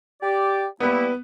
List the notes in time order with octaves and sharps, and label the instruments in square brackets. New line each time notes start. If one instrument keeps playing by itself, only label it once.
[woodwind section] G4 D5
[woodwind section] G3 A#3 E4 [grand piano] B3 B4